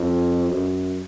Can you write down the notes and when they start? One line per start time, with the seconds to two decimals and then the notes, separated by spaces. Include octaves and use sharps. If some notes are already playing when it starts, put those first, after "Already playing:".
Already playing: F2
0.51 F#2